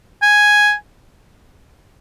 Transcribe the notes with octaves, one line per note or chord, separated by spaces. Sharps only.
G#5